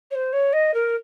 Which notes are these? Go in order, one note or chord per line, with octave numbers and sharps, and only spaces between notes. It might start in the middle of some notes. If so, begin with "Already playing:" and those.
C#5
C5
C#5
D#5
A#4